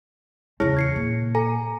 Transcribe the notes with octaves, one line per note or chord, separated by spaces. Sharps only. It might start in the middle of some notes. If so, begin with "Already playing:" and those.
E2 C#3 E4 G#4 C#5
G#6 C7 C#7
A#2
A4 G#5 A#5